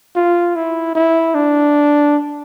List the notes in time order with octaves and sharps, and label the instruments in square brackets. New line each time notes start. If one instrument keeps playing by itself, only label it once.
[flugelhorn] F4
E4
E4
D4